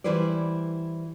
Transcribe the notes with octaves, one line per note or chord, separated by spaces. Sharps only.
E3 G3 E4 B4 C5 D5